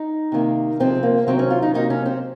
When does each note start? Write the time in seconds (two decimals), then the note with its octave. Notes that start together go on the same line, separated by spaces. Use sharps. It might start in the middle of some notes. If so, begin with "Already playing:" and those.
Already playing: D#4
0.32 C3 D#3 A#3
0.80 C3 F3 G#3 C4
1.03 A#3
1.27 C3 D#3 F#3 C4
1.39 C#4
1.50 F4
1.62 D#4
1.74 C3 F#3 A#3 D#4
1.90 C#4
2.06 C4